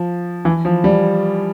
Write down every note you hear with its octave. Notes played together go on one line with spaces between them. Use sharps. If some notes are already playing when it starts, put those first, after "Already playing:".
Already playing: F3
E3
F3
G3